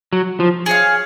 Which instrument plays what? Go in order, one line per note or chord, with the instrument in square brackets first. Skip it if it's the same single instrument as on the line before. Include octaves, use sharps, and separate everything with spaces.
[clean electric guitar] F#3
F3
[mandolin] G#4 C#5 F5